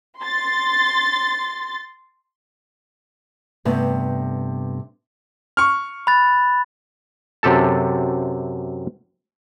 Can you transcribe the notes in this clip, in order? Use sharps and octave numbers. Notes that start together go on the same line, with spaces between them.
C6 A6
G2 C3 A3 B3
C#6 F6
B5 F#6 A6
F#2 C3 G4 A4 A5